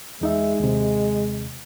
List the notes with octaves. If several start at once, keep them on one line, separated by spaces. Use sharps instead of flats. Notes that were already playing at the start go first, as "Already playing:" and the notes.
E2 G#3 D#4 E5
D#2 C3